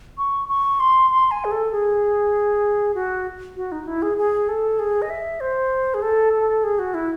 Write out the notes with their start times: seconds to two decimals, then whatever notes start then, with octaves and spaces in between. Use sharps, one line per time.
0.18 C#6
0.49 C#6
0.80 C6
1.10 C6
1.31 G#5
1.45 G#4
1.52 A4
1.72 G#4
2.95 F#4
3.56 F#4
3.72 D#4
3.87 E4
4.02 G#4
4.18 G#4
4.48 A4
4.79 G#4
5.02 D#5
5.10 E5
5.40 C5
5.94 G#4
6.02 A4
6.33 A4
6.64 G#4
6.79 F#4
6.94 E4